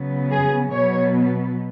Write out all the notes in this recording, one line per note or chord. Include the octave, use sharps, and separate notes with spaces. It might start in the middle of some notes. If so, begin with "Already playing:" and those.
Already playing: C#3 F#3 B3
G#4
B2 F#3 B3 C#5